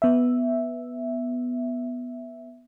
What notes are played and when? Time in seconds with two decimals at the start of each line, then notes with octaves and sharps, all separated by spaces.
0.02 B3 E5